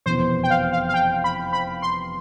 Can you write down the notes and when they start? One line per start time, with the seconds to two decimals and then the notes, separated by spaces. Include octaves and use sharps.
0.06 F1 E2 B2 B3 C5
0.44 G5
0.50 F5
0.73 F5
0.89 F5
0.94 G5
1.24 B5
1.53 B5
1.82 C6